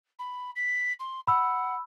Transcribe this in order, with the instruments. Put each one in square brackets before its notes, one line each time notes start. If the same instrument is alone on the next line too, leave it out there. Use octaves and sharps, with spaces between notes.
[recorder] B5
B6
C6
[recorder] F#5 [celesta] B5 E6